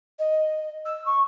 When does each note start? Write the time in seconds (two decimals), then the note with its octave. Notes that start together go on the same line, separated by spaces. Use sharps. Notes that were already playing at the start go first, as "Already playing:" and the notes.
0.19 D#5
0.85 E6
1.05 C#6